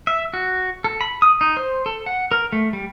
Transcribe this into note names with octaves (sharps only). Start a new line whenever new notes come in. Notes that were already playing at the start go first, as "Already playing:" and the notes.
E5
F#4
A4
B5
D#6
D#4
C5
A4
F#5
A#4
A3
G3